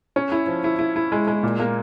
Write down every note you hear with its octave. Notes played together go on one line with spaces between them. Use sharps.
C#4
E4
F3
E4
E4
E4
G#3
G#3
A#2
A#3